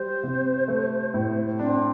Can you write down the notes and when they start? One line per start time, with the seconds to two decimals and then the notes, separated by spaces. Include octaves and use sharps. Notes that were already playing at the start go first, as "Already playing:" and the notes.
Already playing: G3 C5
0.23 C3
0.68 A3
1.14 A2
1.59 C4 D4